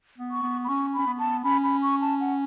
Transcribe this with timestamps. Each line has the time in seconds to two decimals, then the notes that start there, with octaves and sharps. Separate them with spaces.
0.18 B3
0.31 C#6
0.43 B3
0.64 B5
0.69 C#4 C#6
0.94 C#4 B5
1.07 B3
1.19 A5
1.44 C#4 B5
1.63 B5
1.82 C#6
2.01 A5
2.21 F#5